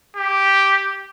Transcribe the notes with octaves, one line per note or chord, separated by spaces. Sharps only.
G4